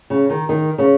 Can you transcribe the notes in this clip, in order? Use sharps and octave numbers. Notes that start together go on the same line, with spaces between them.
C#3
D#3
D#3
C#3